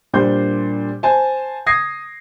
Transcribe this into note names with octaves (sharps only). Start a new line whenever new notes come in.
A#2 G3 D4 C5 C6 G6
C5 G#5 A5
D#6 G#6 A#6 C7